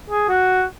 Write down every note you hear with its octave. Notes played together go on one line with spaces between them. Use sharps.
G#4
F#4